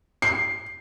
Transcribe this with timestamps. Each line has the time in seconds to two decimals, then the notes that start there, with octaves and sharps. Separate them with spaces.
0.22 C7